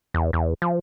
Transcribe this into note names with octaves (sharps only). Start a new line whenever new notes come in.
E2
E2
F3